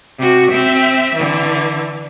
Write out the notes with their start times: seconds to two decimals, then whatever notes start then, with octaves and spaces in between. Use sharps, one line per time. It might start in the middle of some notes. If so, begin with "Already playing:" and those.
0.19 C3 F#4
0.51 C4 E5
1.15 D3 E3